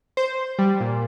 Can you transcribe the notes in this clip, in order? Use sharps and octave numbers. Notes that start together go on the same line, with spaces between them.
C5
G3
A#2